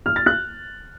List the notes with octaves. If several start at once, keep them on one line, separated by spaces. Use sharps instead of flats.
F6
A6
F#6